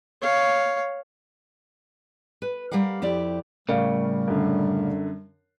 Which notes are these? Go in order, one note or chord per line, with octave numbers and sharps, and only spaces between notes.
C#5 F5
B4
G3 G4 A#4 F5 F#5
F2 E4 G4 D5
A2 C#3 G3 A#4 D5 F5
F#2 D3